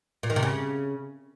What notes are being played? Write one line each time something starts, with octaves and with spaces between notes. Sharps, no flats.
A#2
D#3
C3
C#3